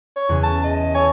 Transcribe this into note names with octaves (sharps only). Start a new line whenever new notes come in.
C#5
E2 C#3
A5
D#5
A4 C#5 G#5